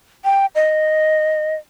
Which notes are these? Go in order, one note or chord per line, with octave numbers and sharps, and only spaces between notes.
G5
D#5